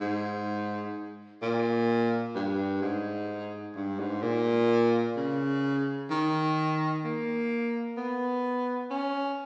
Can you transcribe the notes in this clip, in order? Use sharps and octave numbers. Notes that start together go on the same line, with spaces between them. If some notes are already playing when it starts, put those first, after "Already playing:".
G#2
A#2
G2
G#2
G2
G#2
A#2
C#3
D#3
A#3
B3
C#4